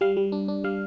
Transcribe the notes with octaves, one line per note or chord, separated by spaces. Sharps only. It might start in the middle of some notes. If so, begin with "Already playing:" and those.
G3 F5
G3
D4
D4
G3 F5